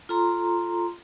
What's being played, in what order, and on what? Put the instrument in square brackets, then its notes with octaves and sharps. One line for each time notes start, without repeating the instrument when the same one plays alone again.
[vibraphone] F4 A4 A#5 C6